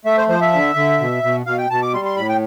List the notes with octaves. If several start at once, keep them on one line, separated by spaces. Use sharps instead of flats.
A3 E5
C5
F3 C5
E5
D3
D3
B2
B2
B2 F5
G5
B2 A5
D6
G3 C6
C6
A2 B5
G5